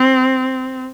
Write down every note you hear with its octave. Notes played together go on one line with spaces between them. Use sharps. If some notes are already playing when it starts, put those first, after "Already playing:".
Already playing: C4